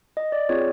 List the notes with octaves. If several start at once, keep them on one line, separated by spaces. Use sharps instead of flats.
D#5
D5
C4 F4 G#4 C#5